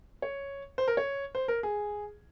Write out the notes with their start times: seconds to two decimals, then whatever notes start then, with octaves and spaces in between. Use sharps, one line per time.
0.22 C#5
0.78 C5
0.88 A#4
0.97 C#5
1.35 C5
1.48 A#4
1.63 G#4